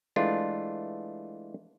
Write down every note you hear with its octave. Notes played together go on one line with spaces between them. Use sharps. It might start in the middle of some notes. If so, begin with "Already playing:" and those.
E3 G#3 A3 D4 F4